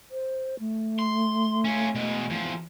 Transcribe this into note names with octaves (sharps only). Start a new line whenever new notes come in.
C5
A3
C6
C#4 F4
B2 G#3
E2 F3